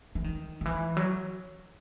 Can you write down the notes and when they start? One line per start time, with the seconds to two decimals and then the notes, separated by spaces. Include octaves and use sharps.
0.15 E3
0.24 D#3
0.61 D#3
0.65 E3
0.97 F#3